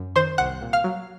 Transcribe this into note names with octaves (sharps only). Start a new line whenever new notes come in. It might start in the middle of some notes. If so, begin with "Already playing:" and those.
Already playing: F#2
D#3 C5 C6
C2 F#5 F#6
A#2
F5 F6
F#3